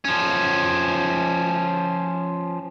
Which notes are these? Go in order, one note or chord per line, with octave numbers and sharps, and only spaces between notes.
F3 C#4